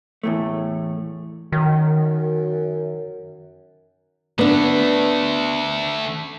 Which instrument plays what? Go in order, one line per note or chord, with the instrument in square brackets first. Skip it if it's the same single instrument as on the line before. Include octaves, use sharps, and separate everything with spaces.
[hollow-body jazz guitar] E2 A2 A3
[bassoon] F#2 [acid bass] D#3
[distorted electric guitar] D3 A3 [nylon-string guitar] B3 D4